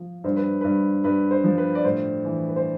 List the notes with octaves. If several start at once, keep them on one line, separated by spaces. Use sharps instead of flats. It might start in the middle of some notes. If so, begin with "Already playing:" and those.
Already playing: F3
G2 C5
B4
G2 B4
G2 B4
C5
F3
B4
D5
A2 C5
E3
B4
C5